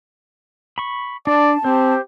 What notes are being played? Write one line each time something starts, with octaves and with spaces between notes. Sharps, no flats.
B5 C#6
D4 D5 A5
C4 G4 C5